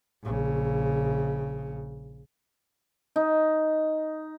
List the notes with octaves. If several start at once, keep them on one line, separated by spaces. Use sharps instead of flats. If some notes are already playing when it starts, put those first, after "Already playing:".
A#1 C#3
D#4